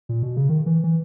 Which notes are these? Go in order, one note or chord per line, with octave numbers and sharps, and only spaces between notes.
A#2
B2
C#3
D#3
E3
E3